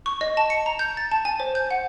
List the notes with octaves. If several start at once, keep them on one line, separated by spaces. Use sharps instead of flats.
C#6
D#5
A5
C#7
A#5
G6
A6
A5
G#5
C5
G6
F#5